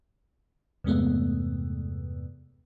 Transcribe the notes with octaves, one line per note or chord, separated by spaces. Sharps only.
E2 G2 C3 G#3 A3 B3